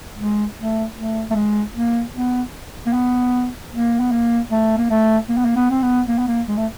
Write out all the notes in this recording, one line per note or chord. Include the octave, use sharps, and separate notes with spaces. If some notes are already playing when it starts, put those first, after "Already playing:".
G#3
A3
A3
A3
G#3
A#3
B3
A#3
B3
A#3
B3
A#3
A3
A#3
A3
A#3
B3
A#3
B3
C4
B3
A#3
B3
A#3
G#3
A3